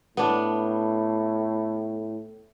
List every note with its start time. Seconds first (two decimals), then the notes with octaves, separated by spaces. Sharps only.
0.17 A2 B3 D4